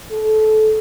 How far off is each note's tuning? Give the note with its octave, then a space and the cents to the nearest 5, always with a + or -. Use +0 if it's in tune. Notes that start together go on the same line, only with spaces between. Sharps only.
A4 -25